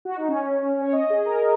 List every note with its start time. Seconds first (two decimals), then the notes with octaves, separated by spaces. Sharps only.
0.05 F#4
0.16 D#4
0.29 C#4
0.82 C#5
0.93 D#5
1.10 G#4
1.26 A#4